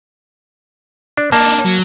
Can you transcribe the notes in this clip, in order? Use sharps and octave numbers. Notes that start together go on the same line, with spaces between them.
D4
A#3 D4 D#4 A5
F#3